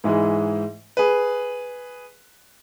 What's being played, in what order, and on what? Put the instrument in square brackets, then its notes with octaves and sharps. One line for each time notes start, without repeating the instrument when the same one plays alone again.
[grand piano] G#2 E3 G#3
G#4 B4